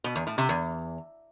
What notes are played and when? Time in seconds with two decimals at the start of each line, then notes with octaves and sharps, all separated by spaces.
0.04 B2
0.16 E2
0.27 A2
0.38 C3
0.49 E2